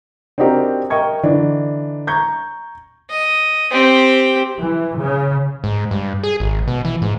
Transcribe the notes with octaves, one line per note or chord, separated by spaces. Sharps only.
C4 D4 D#4 F#4 G4 A#4
A#4 D#5 G5 C#6 G#6
D3 E3 D4 D#4
A#5 C#6 G6 G#6
D#5
C4 G4
E3
C#3
G#2
G2
G#4
G#1
B2
E3
G#2